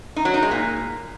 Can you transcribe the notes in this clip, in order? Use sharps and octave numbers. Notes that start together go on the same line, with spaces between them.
D#4
F#3
D#4
G#3
A#2